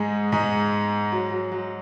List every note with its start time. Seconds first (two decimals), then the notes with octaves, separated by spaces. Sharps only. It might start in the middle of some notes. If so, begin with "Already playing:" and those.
Already playing: G#2 G#3
0.32 G#2 G#3
1.12 F#3
1.31 F#3
1.52 F#3